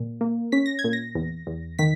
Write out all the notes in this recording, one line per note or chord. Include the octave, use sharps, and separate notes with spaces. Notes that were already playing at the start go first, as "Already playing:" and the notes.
Already playing: A#2
A#3
C#4 B6
A#6
G#6
A#2
A#6
E2
E2
D#3 B6